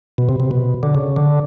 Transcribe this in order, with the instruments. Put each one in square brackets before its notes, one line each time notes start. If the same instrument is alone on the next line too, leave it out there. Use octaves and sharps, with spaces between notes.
[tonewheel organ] B2
C3
C3
B2
D3
C#3
D3